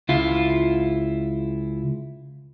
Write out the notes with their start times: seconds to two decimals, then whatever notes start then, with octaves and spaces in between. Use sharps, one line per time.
0.09 C#2 E4 F4